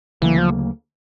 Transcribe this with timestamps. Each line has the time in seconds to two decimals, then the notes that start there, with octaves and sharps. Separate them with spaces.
0.22 D2 C#3 E3 F#3 A#3
0.38 F3